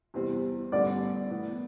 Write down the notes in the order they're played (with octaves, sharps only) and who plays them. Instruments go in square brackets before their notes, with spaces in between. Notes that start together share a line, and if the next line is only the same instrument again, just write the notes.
[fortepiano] E2 C3 E3 G3 C4
[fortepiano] A1 G2 D3 G3 B3 [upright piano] D5
[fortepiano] A2 E3 B3